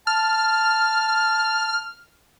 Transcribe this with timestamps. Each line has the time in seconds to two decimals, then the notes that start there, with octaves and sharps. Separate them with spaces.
0.07 A5 F6